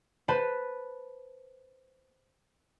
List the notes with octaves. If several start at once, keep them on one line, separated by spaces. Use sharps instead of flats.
B4 C5 A5 B5